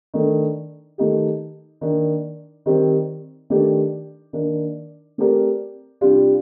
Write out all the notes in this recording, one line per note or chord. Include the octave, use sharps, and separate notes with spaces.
D#3 A3 D4 A4
D#3 A3 D#4 G4
D#3 A#3 D4
D#3 G3 C4
D#3 A3 D4 G4 D5
D#3 A#3 D4
A3 C4 G4 A#4 D5
C3 G3 D4 F4